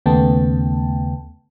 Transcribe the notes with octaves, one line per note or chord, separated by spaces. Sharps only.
D#2 C#3 A3 B3 G5 A5